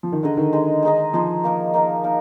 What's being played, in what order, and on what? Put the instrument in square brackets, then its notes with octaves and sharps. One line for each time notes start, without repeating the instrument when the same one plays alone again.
[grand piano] F3
D#3
[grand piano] D3 [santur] G#3 D#4 G#4 D#5
[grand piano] D#3
[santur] G#3 D#4 G#4 D#5
G#3 D#4 G#4 D#5
[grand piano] F3 [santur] G#3 D#4 G#4 D#5
[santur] A#3 D#4 A#4
A#3 D#4 A#4
A#3 D#4 A#4